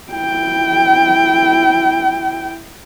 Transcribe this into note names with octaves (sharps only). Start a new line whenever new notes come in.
E4 G5